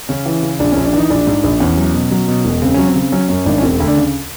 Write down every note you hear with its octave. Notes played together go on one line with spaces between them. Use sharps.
C#3 C#4
E3
C#3
A#1 D4
A#1 C#4
D4
E3 D#4
A#1 D4
G#2
A#1
E2 C#4
F#3
B2
F#3
B2
E1
C#3 C4
F#3 C#4
C4
C#3
F#3 C#4
F#2 C#4
G#1 D4
C#4
E1 C4
D2
D4
C#3